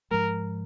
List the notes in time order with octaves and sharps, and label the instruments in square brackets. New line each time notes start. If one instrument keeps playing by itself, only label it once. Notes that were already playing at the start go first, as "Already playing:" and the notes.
[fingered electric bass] G#2 F3 G#3 [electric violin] A#4